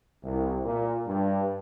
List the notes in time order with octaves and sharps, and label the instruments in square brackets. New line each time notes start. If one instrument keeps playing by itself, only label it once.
[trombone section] C2
A#2
G2